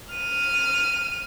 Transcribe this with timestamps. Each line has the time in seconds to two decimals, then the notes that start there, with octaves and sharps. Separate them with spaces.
0.14 F6 D#7